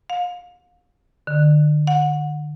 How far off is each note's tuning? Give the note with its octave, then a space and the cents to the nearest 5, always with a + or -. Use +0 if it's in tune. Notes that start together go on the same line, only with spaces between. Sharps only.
F5 +35
D3 +35
F#5 -25